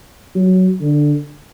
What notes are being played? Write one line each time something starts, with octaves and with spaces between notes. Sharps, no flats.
F#3
D3